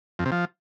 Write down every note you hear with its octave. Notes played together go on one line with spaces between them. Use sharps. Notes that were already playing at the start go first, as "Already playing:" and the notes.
F2
C3
F3